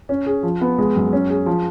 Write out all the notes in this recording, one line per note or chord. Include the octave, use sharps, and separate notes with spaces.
C#4
G#4
F3
B3
G#3
F#2
C#4
G#4
F3